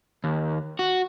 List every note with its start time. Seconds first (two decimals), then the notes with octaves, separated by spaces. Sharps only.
0.24 D#2
0.79 F#4